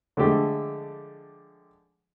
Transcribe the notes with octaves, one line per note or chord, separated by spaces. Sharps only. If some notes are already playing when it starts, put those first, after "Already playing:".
D3 F3 G#3 A3 G4